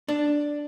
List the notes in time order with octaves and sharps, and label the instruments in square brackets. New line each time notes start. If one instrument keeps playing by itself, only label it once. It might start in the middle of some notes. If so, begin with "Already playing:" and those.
[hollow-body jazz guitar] D4